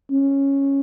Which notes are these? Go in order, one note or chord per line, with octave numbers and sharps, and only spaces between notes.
C#4